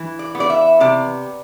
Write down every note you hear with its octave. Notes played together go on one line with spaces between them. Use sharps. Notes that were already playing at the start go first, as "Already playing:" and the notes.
Already playing: E3
D5
B3
D5
E5
C3 D5